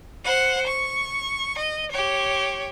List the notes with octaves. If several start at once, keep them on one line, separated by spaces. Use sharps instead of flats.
C5 F#5
C#6
D#5
G4 C#5